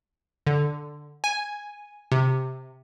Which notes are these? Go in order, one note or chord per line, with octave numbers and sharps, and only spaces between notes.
D3
G#5
C3